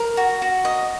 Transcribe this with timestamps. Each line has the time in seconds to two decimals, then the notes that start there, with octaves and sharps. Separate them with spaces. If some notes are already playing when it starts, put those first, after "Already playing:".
Already playing: A#4
0.17 F#4
0.42 F#4
0.65 D#5